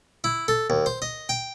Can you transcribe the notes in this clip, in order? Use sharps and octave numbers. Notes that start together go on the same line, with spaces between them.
E4
A4
D#2
C5
D#5
G5